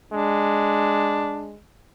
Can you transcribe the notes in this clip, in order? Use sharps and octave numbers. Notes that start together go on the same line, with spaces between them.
G#3 D4